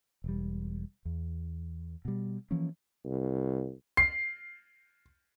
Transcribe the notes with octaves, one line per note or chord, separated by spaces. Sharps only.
E1 G3
E2
B2 G3
E3 F3 A#3 C#4
C2
C7